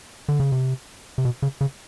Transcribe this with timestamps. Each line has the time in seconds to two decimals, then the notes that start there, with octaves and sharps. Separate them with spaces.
0.29 D3
0.40 C#3
0.52 C3
1.18 C3
1.25 B2
1.42 C#3
1.61 C#3